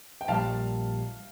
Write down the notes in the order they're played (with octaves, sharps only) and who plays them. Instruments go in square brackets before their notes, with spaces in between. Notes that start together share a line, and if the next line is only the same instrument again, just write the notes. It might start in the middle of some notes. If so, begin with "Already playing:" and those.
[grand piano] G5
[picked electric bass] A#1 A#2 G3 [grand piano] F5 A5